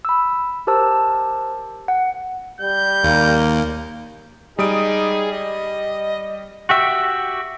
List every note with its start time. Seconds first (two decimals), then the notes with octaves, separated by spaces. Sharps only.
0.05 B5 E6
0.67 G4 A#4 C5 A5 E6
1.88 F#5
2.61 G3 G6
3.04 D#2 A#3
4.59 G3 D#4 G#4 D#6 D7
5.32 D#5
6.69 F#4 G4 E5